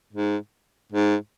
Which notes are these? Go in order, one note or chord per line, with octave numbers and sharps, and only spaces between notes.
G#2
G#2